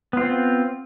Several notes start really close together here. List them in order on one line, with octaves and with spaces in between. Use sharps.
B3 F4 C4